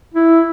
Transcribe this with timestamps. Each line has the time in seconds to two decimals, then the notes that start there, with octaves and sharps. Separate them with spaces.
0.14 E4